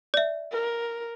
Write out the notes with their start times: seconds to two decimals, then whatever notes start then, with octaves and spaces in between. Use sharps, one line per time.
0.14 D5 E5
0.51 A#4